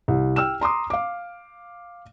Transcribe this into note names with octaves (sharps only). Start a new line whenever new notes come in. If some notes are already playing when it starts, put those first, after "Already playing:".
C2
G5 E6 F6 E7
A#5 C6 D6 D#6
F5 D6